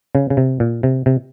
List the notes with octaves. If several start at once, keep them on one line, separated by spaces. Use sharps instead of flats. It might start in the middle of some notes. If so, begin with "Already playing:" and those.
C#3
C#3
C3
A#2
C3
C3